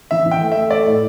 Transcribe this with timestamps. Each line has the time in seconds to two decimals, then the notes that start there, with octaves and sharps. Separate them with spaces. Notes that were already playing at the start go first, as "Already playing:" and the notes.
0.11 E3 E5
0.26 E3
0.31 G5
0.41 A3
0.52 A3 E5
0.71 A3 D5
0.86 A2